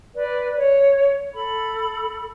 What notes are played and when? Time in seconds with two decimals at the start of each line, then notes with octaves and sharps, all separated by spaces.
0.15 B4 D5
0.58 C#5
1.34 A4 B5